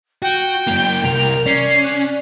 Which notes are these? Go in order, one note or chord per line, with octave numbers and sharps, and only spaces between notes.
F#4 G5
F#2 A#3
C2 A#4 F7
C#4 D5 C7
F#6